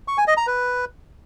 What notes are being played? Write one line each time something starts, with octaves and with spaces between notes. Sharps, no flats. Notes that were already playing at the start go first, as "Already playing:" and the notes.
C#6
G#5
D#5
A#5
B4